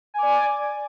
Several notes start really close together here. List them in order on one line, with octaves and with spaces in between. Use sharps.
G#5 D6 D5